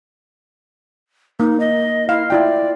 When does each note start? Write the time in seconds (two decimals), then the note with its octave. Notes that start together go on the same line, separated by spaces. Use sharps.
1.40 A#3 D#4
1.60 D#5
2.09 E4 F5
2.30 E4 F4 D5 G5